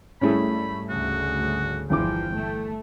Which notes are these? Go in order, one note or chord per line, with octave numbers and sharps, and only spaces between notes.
G#2 G3 A3 C#4 E4 G#4 B5
D2 C#3 F#4
G1 E2 E3 F3 G5 D6
A3